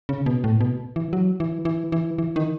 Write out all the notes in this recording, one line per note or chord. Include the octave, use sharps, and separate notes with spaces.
C#3
B2
A2
B2
E3
F#3
E3
E3
E3
E3
D#3